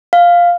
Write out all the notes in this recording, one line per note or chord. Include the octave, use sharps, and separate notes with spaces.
F5